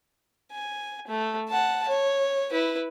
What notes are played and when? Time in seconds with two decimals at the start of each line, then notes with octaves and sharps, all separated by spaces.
0.52 G#5
1.08 A3
1.49 F#5 A5
1.88 C#5
2.51 E4 B4